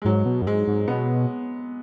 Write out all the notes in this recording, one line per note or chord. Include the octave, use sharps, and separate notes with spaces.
G#3
G#2 F#3
B2
F#2
G#2 G#3
G#2
B2 B3